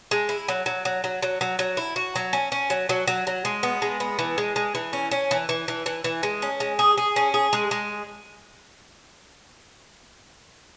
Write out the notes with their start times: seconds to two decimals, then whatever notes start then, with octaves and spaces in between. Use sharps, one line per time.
0.11 G#3
0.29 E4
0.48 F#3
0.66 F#3
0.85 F#3
1.04 F#3
1.22 F#3
1.41 F#3
1.59 F#3
1.77 E4
1.96 F#4
2.16 F#3
2.33 C#4
2.52 C#4
2.70 F#3
2.89 F#3
3.07 F#3
3.27 F#3
3.45 G#3
3.63 B3
3.82 G#3
4.00 B3
4.19 E3
4.38 G#3
4.56 G#3
4.75 E3
4.93 C#4
5.11 C#4
5.31 E3
5.49 E3
5.68 E3
5.86 E3
6.04 E3
6.23 G#3
6.42 C#4
6.60 G#3
6.79 G#4
6.98 G#4
7.16 C#4
7.34 G#4
7.53 G#3
7.71 G#3